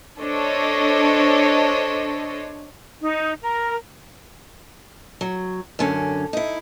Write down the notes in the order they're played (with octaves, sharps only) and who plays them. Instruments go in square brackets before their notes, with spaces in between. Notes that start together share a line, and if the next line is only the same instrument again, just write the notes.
[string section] D4 A4 C5 C#5 D#5
[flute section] D#4
A#4
[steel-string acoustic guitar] F#3
F#2 D3 C#4
D#4 E4